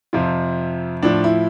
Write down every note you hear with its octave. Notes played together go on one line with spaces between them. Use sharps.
F2 C3 F3 F4
A2 F3 D4
E4